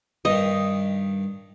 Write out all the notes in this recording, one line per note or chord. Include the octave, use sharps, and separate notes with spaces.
G2 D#3 D#5